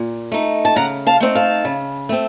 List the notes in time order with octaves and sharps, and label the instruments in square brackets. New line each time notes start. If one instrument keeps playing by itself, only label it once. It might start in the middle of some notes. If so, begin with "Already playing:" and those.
Already playing: [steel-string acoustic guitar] A#2
A3 D#4
A5
C#3 F#5 A#5
F5 A5
A3 C4 D#4
F5 A5
C#3
A3 C4